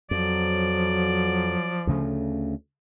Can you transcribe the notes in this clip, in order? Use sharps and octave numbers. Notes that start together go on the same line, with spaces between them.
F2 F3 F#3 D5
D2 C#3 A3